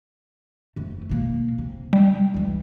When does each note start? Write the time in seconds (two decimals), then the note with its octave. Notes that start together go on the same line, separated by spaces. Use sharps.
0.76 F1 A3
1.09 B2 A#3
1.58 C3
1.93 G3
2.34 C#2 E3